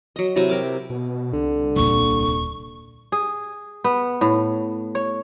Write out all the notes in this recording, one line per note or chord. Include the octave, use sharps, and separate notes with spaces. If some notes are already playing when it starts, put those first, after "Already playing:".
F#3 D#5
C3 F#3 E4 A#5
G4 A#4 D6
B2
C2 D3
D#1 A#2 C#6
G#4
B3
A2
C#5